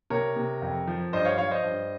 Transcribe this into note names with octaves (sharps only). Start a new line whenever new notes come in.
C3 A#4 C#5
C3
F2
F3
G2 C5 D#5
C#5 F5
F3 C#5 F5
C5 D#5
G2